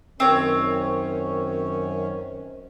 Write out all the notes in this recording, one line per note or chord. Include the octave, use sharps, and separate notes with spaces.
F#2 D#3 C4 C#4 C#5